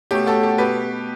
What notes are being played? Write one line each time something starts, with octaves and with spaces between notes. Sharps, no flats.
B2 A3 C#4 G4
F#4 A4
G4
B2 G4 B4